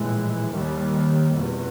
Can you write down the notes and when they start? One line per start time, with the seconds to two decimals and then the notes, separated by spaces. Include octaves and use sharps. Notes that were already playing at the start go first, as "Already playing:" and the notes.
Already playing: A#1 A2 E3 G#3
0.51 D#2 D#3 G3
1.32 F1 E2 B2